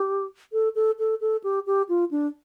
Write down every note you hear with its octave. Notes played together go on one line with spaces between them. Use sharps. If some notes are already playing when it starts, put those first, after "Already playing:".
Already playing: G4
A4
A4
A4
A4
G4
G4
F4
D4